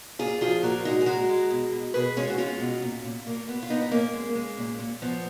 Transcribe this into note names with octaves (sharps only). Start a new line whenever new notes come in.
A#2 F4 G#4
F3 F4 G#4
A#2 F#4 A#4
G#3 D#4 F#4
G#4
G#3 F#4 A#4
G#3
B2
B2
B2 G#4 B4
G#3 C#4 F4
F#4
G#3 C#4 F4
B2
A#2
A#2
A#2 A#3
A#2 B3
F4
A#2 B3 D#4
D#4
A#2 A#3 C#4
G#3
G#3
A#2
A#2
F3 B3